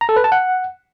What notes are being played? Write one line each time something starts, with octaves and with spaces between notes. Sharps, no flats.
A#5
A4
B4
A5
F#5